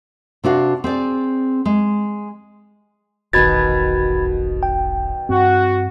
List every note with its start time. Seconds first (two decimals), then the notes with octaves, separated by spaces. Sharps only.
0.44 C3 D4 F#4 F5
0.84 C4 G#4 D5
1.65 G#3
3.33 E1 A#1 B2 D#3 B3 B5 G#6 A6
4.63 G5
5.29 G2 C4 F#4